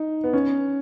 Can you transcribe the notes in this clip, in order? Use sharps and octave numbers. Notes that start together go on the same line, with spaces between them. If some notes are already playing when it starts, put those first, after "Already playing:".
Already playing: D#4
B3
C#4